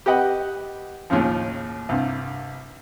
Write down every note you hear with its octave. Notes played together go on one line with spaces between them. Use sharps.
G4 B4 D#5 F#5
D#2 A2 C#3 F3
C2 G2